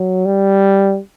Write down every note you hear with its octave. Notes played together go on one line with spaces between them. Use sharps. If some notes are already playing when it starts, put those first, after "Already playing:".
Already playing: F#3
G3